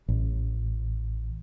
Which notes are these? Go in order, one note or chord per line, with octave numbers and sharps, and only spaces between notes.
A1